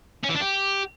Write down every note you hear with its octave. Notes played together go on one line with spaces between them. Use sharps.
C#4
E3
D4
G4